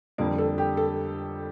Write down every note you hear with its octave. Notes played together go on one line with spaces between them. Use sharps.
F2 D3 G3 A#3 A#4
A4
G4
A4